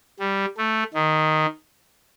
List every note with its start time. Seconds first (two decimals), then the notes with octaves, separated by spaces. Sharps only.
0.20 G3
0.57 A3
0.94 D#3